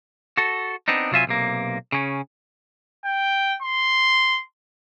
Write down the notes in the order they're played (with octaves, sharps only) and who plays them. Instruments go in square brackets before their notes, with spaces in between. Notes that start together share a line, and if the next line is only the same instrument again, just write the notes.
[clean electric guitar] F#4 A4
B3 C4 D4 D#4
C3 F#3 F4 E5 G#5
B1 C3 A#3
C#3 C#4
[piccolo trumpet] G5
C6